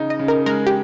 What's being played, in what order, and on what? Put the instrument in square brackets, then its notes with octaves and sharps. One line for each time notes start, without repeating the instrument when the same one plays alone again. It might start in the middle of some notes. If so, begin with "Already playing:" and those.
Already playing: [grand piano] C#3 D#4
[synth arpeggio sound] D#5
[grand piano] C#3
[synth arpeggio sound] A#4
[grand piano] G#3 [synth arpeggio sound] A#4
[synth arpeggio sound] G4